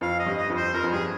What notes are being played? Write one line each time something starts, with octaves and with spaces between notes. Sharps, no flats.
F2 F5
D#5
G2
D#5
F2
C5
F2 A#4
F2
G2 G#4